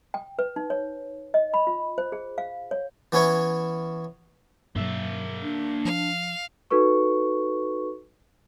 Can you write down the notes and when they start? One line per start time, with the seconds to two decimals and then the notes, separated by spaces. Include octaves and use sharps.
0.14 G5
0.39 B4
0.56 D#4
0.70 C#5
1.34 D#5
1.54 B5
1.67 F4
1.98 C5
2.12 G#4
2.38 F5
2.71 C#5
3.12 E3 B3 C#4 E4 C#5
4.76 G2 B2 F#3 A#3 E5
5.43 D4
5.85 F3 F5
6.70 D#4 F#4 A4 B4 C#6